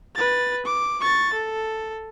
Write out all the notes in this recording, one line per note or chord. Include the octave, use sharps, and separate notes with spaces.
B4 A6
D6
C#6 A6
A4